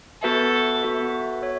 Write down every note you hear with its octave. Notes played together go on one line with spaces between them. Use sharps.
B3 F#4 A4 B4 E5
B3 F#4 B4 E5
C#5 E5